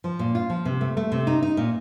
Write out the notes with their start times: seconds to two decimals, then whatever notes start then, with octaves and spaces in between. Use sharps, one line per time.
0.04 F3
0.19 A#2
0.35 F4
0.50 F3
0.65 C3
0.81 A3
0.97 A3
1.12 C3
1.27 D#4
1.42 D#4
1.57 A#2